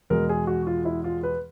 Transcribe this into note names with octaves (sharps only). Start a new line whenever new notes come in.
E2 B2 G#3 A#4
G#4
F#4
F4
E4
F4
B4